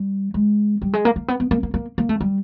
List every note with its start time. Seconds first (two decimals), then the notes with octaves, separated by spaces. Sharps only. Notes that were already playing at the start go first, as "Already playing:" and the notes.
Already playing: G3
0.34 G#3
0.82 G3
0.94 G#3
1.05 A#3
1.16 A#3
1.28 B3
1.40 B3
1.51 A#3
1.63 A#3
1.74 A#3
1.98 A#3
2.09 A3
2.21 G3